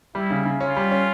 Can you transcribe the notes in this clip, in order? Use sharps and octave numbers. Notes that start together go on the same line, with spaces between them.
G3 E4
C#3
C#3
C#4 F4
G3
C#4